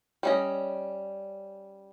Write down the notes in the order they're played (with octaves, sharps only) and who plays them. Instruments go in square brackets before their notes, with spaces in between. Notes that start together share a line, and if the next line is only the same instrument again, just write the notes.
[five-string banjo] G3 C#4 D#5